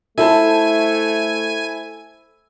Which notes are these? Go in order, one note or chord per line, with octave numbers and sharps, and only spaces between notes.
A3 E4 A4 C5 G#5 A5